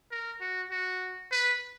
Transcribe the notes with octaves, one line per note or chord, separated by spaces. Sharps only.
A#4
F#4
F#4
B4